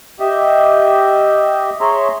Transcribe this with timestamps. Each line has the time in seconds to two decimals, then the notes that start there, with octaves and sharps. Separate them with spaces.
0.20 G4 D#5 E5
1.81 G#4 C#5 E5 A#5 C6